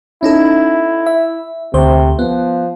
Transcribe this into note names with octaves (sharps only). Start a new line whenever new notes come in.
C#4 D#4 E4 A4
E5
D2 C3 C5
F3 B3